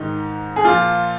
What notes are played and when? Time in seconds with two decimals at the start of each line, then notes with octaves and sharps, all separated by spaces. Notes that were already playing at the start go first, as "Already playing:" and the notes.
Already playing: G#2 D#3 D#4
0.56 G#4
0.64 A#2 F3 F4